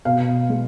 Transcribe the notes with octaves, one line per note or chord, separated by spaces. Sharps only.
B2 F5
G#3